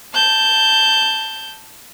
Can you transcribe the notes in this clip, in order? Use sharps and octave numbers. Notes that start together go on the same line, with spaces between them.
A5 G6